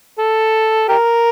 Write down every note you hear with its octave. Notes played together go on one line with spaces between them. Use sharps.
A4
G4 A#4